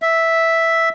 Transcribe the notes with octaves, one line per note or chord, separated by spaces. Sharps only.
E5